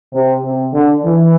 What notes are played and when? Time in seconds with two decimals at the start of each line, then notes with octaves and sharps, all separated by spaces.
0.13 C3
0.43 C3
0.73 D3
1.04 E3